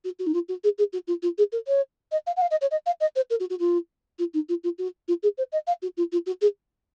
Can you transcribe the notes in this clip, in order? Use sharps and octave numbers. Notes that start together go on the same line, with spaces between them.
F#4
F#4
D#4
F4
F#4
G#4
G#4
F#4
F4
F4
G#4
A#4
C#5
D#5
F5
F#5
F5
D#5
C#5
D#5
F5
D#5
C5
A#4
F#4
F#4
F4
F4
D#4
F4
F4
F#4
F4
G#4
C5
D#5
F5
F#4
F4
F4
F#4
G#4